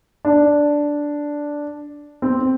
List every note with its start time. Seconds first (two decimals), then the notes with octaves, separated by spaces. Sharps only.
0.25 D4
2.22 C4